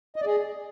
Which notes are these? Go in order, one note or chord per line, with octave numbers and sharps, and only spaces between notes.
D#5
D5
G#4